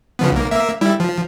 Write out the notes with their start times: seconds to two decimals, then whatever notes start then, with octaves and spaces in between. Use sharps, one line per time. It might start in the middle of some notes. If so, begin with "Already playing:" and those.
0.19 C#3 F3 B3
0.32 B1 A#3
0.51 A#3 E5
0.81 G3 E4
1.00 F3